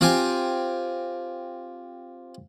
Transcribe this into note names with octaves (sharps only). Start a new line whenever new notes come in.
C4 F4 G4 G#5